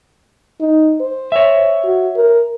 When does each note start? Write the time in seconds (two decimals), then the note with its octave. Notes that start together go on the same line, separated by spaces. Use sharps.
0.60 D#4
1.01 C5
1.32 C#5 E5
1.84 F#4
2.16 A#4